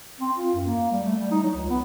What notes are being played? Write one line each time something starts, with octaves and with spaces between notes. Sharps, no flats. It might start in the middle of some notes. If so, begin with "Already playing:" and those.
C4
F4
F#2
A#3
G3
A3
G3
D#4
F#3
C#2
B3